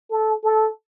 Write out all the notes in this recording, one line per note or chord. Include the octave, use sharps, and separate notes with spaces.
A4
A4